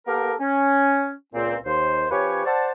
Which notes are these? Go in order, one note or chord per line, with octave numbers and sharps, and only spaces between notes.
A#3 B3 G4 A4 A#4
C#4
C#2 A#2 C4
D#2 C5
F3 C#4 G4 B4 C#5
C5 D5 F#5 A5